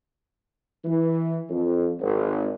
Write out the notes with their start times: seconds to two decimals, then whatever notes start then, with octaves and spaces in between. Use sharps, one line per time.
0.85 E3
1.49 F2
2.00 G#1